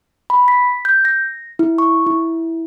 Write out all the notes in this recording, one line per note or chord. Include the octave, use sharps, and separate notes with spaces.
B5
B6
G6
A#6
E4
C#6
E4